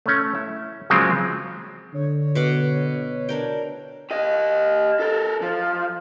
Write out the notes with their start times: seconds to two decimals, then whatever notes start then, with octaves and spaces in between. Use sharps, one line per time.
0.06 A3 C#4
0.35 E4
0.90 C#3 F3 F#3 G#3 A#3 C4
1.94 D3 C#5
2.35 B2 F#5 D6
3.29 D4 A#4 G5
4.11 G4 D#5
5.00 A4 A#4
5.41 F3